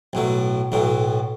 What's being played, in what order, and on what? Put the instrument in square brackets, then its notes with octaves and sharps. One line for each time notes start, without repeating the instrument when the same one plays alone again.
[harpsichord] B1 A2 F#3
B1 A2 F#3